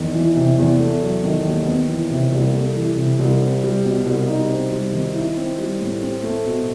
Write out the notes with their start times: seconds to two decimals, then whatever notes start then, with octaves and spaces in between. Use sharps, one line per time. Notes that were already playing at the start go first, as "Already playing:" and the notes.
Already playing: E2 D#3
0.14 E3
0.36 C3
0.58 E2
0.79 A3
1.01 F#3
1.23 D#3
1.45 D#2
1.66 B3
1.88 E3
2.10 C3
2.32 C2
2.54 A3
2.75 E3
2.96 C3
3.19 C2
3.41 C4
3.63 G3
3.84 B2
4.05 C2
4.28 D#4
4.49 C4
4.72 G3
4.92 D#3
5.14 E4
5.36 C4
5.58 G3
5.81 A2
6.02 C4
6.23 A3
6.46 B2